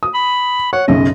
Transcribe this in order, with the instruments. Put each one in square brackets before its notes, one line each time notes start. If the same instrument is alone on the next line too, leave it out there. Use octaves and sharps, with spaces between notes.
[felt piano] D#6
[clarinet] B5
[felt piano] C#5 [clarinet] F#5
[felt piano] B1 F#2 C#3 [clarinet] D#5